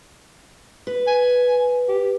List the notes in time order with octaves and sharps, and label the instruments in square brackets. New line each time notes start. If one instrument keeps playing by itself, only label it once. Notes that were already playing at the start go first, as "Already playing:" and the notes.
[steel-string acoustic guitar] B4
[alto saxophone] G#5
G4